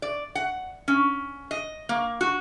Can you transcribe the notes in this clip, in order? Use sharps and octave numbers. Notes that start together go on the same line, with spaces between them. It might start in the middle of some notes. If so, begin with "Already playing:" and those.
D5
F#5
C#4
D#5
A#3
F#4